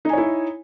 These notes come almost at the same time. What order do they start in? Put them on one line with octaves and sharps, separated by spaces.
D#4 G#5 C#5 E4